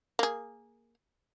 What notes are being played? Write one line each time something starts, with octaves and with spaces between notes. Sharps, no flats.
A#3 G#4